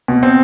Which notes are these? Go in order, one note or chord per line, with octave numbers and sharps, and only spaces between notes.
B2
C4